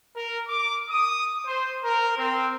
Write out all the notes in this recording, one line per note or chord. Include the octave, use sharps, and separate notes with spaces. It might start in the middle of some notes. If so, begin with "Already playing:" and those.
A#4
D6
D#6
C5
A#4
C4